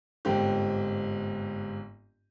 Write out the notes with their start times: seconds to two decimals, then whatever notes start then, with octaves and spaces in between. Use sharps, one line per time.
0.25 G1 G#2 C4 G4